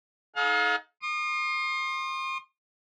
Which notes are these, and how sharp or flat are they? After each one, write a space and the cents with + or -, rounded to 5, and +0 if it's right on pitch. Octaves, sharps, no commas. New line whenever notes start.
D#4 +20 A4 -45 F5 +35
C6 +30 D#6 -35